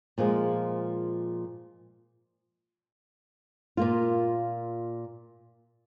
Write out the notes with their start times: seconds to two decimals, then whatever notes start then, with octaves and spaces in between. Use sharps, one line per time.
0.18 A#2 F3 G#3
3.77 A#2 A#3 F4